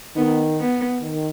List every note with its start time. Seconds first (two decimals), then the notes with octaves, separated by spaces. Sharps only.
0.16 D#3 B3 D#4
0.59 B3
1.02 D#3